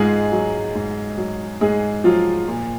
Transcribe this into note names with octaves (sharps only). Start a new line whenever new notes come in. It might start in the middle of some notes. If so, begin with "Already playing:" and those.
Already playing: G#2 G#3 D#4 F4 G#4
F#3
G#2
F#3
G#2 G#3 G#4
F3 F#3 F4
A#2